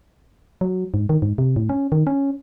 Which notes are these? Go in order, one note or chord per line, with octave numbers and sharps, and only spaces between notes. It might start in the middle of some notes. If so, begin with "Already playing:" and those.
F#3
G#2
D#3
G#2
C3
A2
C#4
D#3
C#4